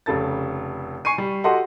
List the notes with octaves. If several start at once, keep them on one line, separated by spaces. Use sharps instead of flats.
F1 C#3 A4 A6
G#5 C#6 C7 D#7
G3
F#4 G4 A4 D#5 F#5 C6